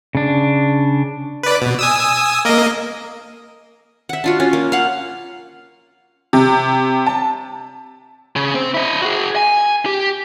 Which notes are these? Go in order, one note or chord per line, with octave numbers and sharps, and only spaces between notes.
C#3 D4
B4 D5
B2
G#5 D#6 E6
A#3 A#4 D#5
E5 F#5
D4 F4 F#4
C#4 F4
A#3
F5 F#5
C3
A5
C#3
C4 C5
E4 D#5
F#4 G#4
G#5
G4